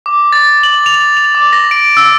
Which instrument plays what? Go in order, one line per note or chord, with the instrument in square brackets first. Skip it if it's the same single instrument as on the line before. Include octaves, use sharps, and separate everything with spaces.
[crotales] D6
A6
F#7
F7
F7
D6
A#6
D7
E6